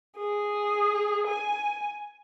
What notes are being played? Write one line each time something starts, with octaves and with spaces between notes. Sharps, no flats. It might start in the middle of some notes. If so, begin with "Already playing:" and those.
G#4
G#5